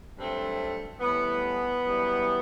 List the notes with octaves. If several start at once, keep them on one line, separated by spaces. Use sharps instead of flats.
G2 F#3 A3 C4
A2 E3 G3 B3
F#2 E3 G3